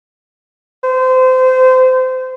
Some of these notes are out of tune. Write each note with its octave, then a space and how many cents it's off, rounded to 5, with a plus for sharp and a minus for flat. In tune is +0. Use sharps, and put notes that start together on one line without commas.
C5 -25